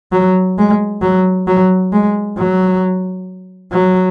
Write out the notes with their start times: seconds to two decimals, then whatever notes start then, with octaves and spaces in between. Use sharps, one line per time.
0.12 F#3
0.58 G#3
1.02 F#3
1.47 F#3
1.93 G#3
2.38 F#3
3.72 F#3